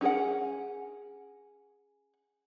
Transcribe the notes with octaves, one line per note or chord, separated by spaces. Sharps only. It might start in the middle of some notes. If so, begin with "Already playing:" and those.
C#4 D#4 G#4 A#4 F#5